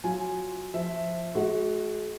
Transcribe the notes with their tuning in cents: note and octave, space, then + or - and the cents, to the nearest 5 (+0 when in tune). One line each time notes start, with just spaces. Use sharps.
F#3 +0 F4 +5 G#5 +0
F3 +0 C5 +0 E5 +0
G#3 +40 F#4 +0